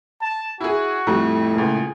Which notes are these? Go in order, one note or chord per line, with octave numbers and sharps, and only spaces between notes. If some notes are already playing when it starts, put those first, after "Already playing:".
A5
E4 F#4 G#4
F2 A2 G3
C#2 A#2 G#4